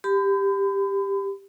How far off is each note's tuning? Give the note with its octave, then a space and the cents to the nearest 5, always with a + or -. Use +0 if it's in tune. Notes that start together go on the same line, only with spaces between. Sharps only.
G4 +10 B5 +40